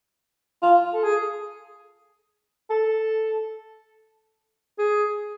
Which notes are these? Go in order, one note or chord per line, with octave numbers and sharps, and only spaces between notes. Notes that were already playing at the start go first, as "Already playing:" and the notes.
F4
A4
G#4
A4
G#4